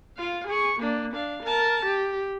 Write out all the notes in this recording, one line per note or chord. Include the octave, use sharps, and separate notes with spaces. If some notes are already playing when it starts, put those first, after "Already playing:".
F4 F5
G#4 C#6
A#3 D4
D4 F5
A#4 A5
G4